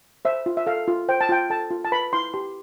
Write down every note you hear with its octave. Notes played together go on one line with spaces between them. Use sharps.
C5 E5
F4
E5
A4 F5
F4
C5 G5
A5
F4 G5
A4 A5
F4
A5
B4 B5
E4 C6
G4 C6